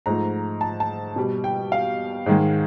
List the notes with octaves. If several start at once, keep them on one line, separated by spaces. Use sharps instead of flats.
G#2 F3 A3 A#5
A5
A5
B2 G3
G5
F5
G#2 D#3 G#3